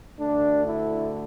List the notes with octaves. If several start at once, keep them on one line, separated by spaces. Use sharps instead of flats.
D2 D3 A3 D4
E4